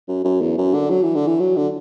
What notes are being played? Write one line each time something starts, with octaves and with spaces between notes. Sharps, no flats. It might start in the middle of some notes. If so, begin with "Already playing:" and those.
F#2
F#2
E2
F#2
D3
F#3
E3
D3
E3
F#3
D3